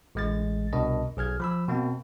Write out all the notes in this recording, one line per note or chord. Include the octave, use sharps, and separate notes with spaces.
A1 G#3 A6
C2 B2 D4 A#4 D#5
B1 G#4 F6 G#6
F3 B5 E6
B2 A#3 C4